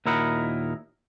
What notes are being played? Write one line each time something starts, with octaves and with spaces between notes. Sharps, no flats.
D#2 A#2 E4 A#4 D#5 F#5